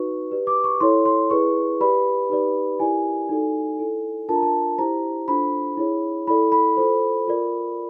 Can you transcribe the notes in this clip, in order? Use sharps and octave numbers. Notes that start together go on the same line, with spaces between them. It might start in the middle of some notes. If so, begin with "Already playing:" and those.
Already playing: D#4 F#4 B4 D5 C#6
G4 B4 D5
D6
C#6
E4 A4 C#5 C6
C6
E4 G#4 B4 D5 C#6
G4 B4 D5 B5
D#4 G4 B4 D5
E4 G4 A#4 D5 G#5
D#4 F#4 A4 D5
E4 A4 D5
D4 F4 A#4 A5
A#5
A5
E4 G4 C5 A#5
D4 F4 A4 C5 B5
E4 G#4 C#5
E4 A4 D5 B5
B5
F4 A4 C5
F4 A#4 D5